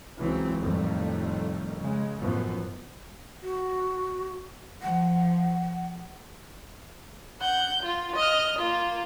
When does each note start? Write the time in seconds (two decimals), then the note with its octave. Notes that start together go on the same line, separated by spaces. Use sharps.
0.18 C#2 C#3 E3 F#3 C4
0.61 F2 A2 D#3 G3 A3
1.80 C#3 G#3
2.19 A1 F#2 F3 B3
3.42 F#4
4.82 F3 F#5
7.41 F#5 G6
7.83 F4
8.16 D#5 F6
8.58 A#3 F4